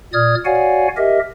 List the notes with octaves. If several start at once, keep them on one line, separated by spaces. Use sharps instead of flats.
A#2 D5 D#6 F6 G#6
F#4 C#5 D5 F5 F#5 G#5
G4 A#4 D#5 E5